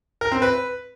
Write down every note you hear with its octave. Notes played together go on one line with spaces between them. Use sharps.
A#4
C4
B4